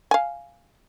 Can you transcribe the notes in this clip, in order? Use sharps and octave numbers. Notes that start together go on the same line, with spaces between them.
F5 G#5